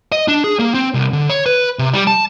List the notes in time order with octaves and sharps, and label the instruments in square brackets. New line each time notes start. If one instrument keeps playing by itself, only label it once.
[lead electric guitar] D#5
D4
G#4
A#3
C4
C2
D3
C#5
B4
C3
G3
A5